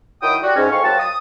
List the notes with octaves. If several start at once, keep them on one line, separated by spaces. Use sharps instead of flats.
D#3 F#3 E4 G5 D#6
G3 F#4
G#2 C#4
A2 G#3 C4 F5 C#6
F#3 A#3 C4 F#4 A5
D#6